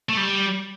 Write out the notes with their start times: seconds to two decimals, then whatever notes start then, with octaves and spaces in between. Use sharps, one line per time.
0.09 A3
0.17 G3